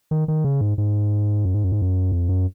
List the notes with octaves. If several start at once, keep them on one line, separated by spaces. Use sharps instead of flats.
D#3
D#3
C#3
G#2
G#2
F#2
G#2
F#2
G#2
F#2
F2
F#2